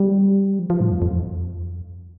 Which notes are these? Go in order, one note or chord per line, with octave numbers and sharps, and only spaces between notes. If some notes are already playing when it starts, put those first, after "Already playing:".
Already playing: G3
F3
F3
A2
F2
F2
E2
F2